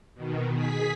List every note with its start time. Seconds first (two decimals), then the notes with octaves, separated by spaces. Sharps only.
0.14 B2 D#3
0.54 G#4 B6